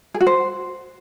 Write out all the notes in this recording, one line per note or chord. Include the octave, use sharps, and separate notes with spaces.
G#4
F#4
C5